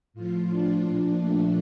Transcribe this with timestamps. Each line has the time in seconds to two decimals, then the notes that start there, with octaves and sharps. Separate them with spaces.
0.14 A2 F3 F4
0.49 D4
0.83 A#2 F3
1.17 A3